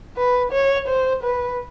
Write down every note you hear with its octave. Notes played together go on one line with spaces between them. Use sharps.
B4
C#5
C5
B4